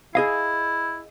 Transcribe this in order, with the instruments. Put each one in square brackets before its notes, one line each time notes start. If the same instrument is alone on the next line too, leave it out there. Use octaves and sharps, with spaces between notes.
[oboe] E4 [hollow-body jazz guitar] G#4 D#5 F5